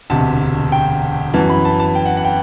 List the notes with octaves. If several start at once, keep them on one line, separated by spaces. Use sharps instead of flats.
E1 D2 C3 A5
G5
F#2 E3 B3 A5
B5
A5
A5
G5
F#5
F#5
G5